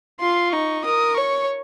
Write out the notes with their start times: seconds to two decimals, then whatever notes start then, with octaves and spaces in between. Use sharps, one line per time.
0.20 F4 C6
0.52 D#4 C#6
0.85 A#4 D#6
1.17 C#5 C#6